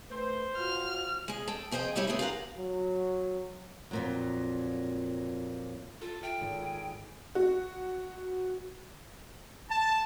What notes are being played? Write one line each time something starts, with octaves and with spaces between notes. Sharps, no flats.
A3 B4 C5
F4 F#4 F6
G#3 G#4
A4 G5
F2 G#4 C5 D#5 G5
D#3 G3 D4 E4 G4 C#5
A3 B3 C4 G#4 B4
F4 G4 G#4 A#4 F#5
F#3
F2 A#2 F#3
F4 A4
F4 E5 G5 A6
G#1
G#4
F#4
A5